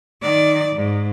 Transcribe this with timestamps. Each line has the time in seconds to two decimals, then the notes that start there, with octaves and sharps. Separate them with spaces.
0.22 D#3 D5
0.76 G#2